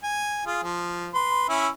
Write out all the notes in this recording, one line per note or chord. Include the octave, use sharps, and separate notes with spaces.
G#5
F4 G#4
F3
B4 C6
C#4 E4 E5